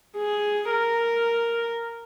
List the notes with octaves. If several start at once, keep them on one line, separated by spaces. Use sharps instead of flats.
G#4
A#4